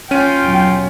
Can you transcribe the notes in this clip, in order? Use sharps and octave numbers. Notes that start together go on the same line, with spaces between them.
C#4 F4 G5 D#7
D#2 B2 F#3